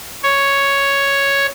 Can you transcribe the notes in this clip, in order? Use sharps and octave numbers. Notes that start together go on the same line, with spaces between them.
C#5